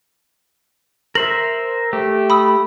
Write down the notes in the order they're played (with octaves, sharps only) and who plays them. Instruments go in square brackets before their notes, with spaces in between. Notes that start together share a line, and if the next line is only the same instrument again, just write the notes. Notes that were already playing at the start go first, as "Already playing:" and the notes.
[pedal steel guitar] A#4 C5 E5 [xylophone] F#7
[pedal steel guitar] A3 G4
[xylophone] B5 D#6 E6